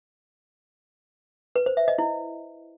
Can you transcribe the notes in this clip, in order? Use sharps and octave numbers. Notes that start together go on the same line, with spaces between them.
B4
C5
E5
D#5
E4